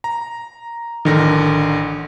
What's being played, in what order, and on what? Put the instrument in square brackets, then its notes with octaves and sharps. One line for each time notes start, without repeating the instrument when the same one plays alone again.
[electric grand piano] A#5
[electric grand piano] A1 D3 A#6 [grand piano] D#3